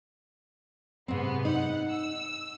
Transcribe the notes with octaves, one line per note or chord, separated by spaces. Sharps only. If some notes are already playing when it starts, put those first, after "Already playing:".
G#2 C3 B3 C4
D#4 F#5
E6